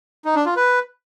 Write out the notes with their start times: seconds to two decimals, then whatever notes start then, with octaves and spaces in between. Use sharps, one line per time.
0.25 D#4
0.35 D4
0.46 F4
0.56 B4